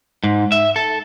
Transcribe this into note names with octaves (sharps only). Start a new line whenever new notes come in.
G#2
E5
A4